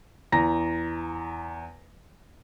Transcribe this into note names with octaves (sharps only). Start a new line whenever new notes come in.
E2 A#5 A#6